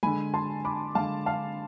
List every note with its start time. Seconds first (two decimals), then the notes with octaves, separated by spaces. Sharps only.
0.03 D3 G#3 G#5 B5
0.34 A5 C6
0.65 B5 D6
0.95 D3 G#3 F5 A5
1.26 F5 A5